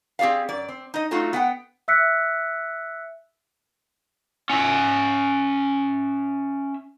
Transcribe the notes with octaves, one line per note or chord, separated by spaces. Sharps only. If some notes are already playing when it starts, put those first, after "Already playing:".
C4 G4 G#4 D5 F5
F#2 D5
C4
D#4 D#5
F#3 A3 D#4 F4 F#4
B3 F#5 G5
E5 E6 F#6 B6 C#7
C#4 E5